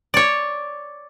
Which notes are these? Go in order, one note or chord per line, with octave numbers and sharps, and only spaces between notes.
C#5 D5